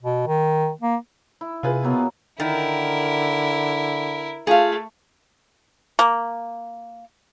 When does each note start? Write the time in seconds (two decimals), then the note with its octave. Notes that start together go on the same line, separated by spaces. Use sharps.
0.03 B2
0.27 D#3
0.81 A#3
1.41 E4
1.63 C3 F4 G#4 B4
1.83 B2 F#3 A#3 B3
2.40 D3 D#3 E4 A#4
4.47 A3 F4 G#4 F5
5.99 A#3